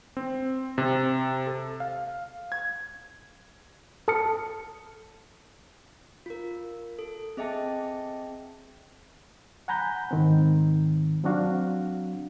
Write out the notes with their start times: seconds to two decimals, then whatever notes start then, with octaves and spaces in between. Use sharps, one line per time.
0.17 C4
0.78 C3
1.47 A4
1.80 F5
2.52 G#6
4.08 A4 A5 D#6 F6 C#7
6.26 F4 A#4
6.99 A4
7.37 C4 G#4 D#5 E5 G5 A5
9.68 F#5 G#5 A#5 B5 G6
10.11 G#2 D#3 C4
11.24 F#3 C4 D4 F#4 F5